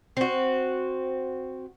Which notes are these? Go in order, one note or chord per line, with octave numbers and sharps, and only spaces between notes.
C4 F#4